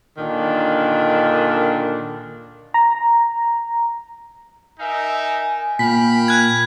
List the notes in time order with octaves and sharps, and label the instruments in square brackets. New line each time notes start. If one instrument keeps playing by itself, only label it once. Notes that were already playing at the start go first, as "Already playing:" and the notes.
[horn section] A#2 D3 D#3 D4
[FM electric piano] A#5
[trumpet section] D#4 A#4 E5 [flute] G#5
[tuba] A#2 [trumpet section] F5 G5 B5 [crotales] B6
[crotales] F#6 G#6